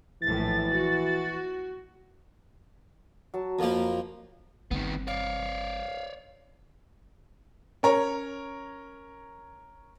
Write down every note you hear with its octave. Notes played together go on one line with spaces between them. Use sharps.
A#1 A2 E3 A6
F#4
F#3 A5
F2 F3 A#3 A#4 B5
G1 D#3 B3 C4
C#5 D5 F5
C#4 A#4 C#5